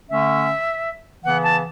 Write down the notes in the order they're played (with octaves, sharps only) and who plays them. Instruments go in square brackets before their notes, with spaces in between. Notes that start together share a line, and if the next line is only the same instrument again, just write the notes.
[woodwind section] D3 A3 C#4 E5
C#3 E3 B3 F#5
A5